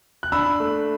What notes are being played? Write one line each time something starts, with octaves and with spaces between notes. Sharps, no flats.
F#6
D4 B5 E6
A3